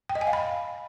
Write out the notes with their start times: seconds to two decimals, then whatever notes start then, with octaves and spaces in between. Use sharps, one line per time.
0.09 G5
0.15 D#5
0.21 G#5
0.27 F5
0.33 B5